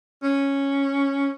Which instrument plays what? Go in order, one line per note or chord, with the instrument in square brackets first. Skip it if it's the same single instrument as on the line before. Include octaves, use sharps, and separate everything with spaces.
[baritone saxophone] C#4